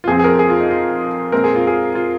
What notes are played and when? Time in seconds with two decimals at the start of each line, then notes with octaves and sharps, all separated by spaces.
0.04 F4
0.08 F2 F3 C4 G#4
0.19 G#4
0.24 A#4
0.39 G#4
0.50 F4
0.60 D#4
0.70 F4
1.32 A#2 G#3 C4 A#4
1.44 G#4
1.56 F4
1.67 G#4
1.95 F4